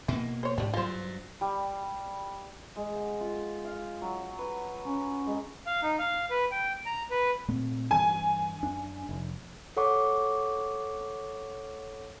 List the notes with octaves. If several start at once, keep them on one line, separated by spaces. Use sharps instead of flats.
B2 E3 A#3
C5 C#5
G#2 G3 D4
G2 F#3 F4 C5
G3
G#3
F#5
F4
F5
F#3
B4
C#4
G#3
F5
D#4
F5
B4
G5
A#5
B4
A#2 A3 C4
G2 E3 G#5
F#2 D4
F1
A4 C#5 F#5 C#6 D6